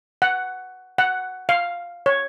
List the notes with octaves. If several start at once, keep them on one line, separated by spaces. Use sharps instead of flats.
F#5
F#5
F5
C#5